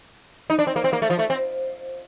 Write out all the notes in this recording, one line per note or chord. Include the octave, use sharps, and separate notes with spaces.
D#4
D4
C4
A#3
C4
A#3
A3
F3
A3
C4